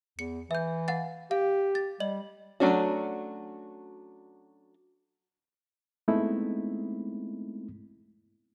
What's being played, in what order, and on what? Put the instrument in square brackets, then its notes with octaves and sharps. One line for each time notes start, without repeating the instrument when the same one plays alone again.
[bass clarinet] E2 [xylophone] C#7
[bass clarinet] E3 [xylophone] E5 G6
[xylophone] F5 F#5 A6
[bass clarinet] G4 [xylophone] F5
[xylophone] A6
[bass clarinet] G3 [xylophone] D5 D#5 F#7
[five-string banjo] F#3 A3 C#4 D4 F#4
[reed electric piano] G#3 A3 B3 C4 D#4 E4